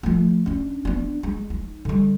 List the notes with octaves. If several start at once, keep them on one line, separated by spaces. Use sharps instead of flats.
F3 A3
C#4 D4
B3 D4
G#3
D#4
D3 G3